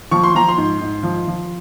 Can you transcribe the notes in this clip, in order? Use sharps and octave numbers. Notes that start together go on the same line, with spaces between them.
F3 C#6
C6
F3 A#5
C6
G#2
G#2
F3
F3